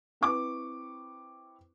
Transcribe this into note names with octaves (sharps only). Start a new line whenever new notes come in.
C4 E4 B4 C#6 D6